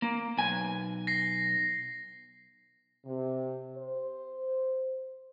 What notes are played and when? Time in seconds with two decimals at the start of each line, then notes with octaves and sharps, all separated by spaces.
0.02 A#3
0.37 B1 G#5
1.07 A#6 C7
3.06 C3
3.78 C5